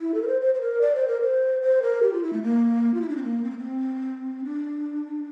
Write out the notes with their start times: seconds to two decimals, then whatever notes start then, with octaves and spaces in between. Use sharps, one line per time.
0.01 E4
0.14 A4
0.22 A#4
0.28 C5
0.41 C5
0.55 C5
0.61 A#4
0.81 D5
0.95 C5
1.08 A#4
1.21 C5
1.62 C5
1.82 A#4
2.03 G4
2.13 F4
2.23 E4
2.33 A3
2.43 A#3
2.94 F4
3.02 E4
3.09 D4
3.17 C4
3.23 A#3
3.44 C4
3.51 A#3
3.58 C4
4.45 D4